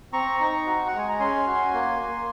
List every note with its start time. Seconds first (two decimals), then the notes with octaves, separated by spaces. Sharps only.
0.13 C4 A#5 C#6
0.40 D#4
0.66 F#4
0.87 F#5
0.93 G#3
0.98 G#5
1.08 A#5
1.19 C#4 G#5 C6
1.46 F#4
1.73 A#3
1.99 A#3